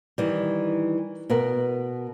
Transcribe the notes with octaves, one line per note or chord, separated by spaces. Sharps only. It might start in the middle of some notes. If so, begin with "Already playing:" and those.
D#3 E3 G3
B2 B3 A#4